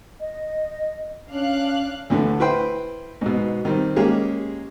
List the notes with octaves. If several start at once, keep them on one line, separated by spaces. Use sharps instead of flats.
D#5
C#4 D4 F5 F#6
D2 A2 D3 E3
E4 B4 C5 G5
G#2 B2
D#3 G3 C4
G#3 A#3 C#4 G4 G#4